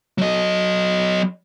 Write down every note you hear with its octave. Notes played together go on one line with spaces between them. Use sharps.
F#3 D#5